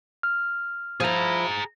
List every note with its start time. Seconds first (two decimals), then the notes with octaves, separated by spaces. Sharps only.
0.23 F6
1.00 F3 E4 G#4 A#5